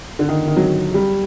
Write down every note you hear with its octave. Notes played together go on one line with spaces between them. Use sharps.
D3
D#3
D#3
F#3
G3